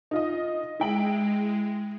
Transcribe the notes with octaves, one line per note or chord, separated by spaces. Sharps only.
D#4 F4 D#5
G#3 E4 G5 F#7